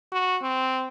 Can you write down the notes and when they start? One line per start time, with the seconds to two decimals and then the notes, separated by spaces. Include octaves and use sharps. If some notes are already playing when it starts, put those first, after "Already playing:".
0.12 F#4
0.43 C4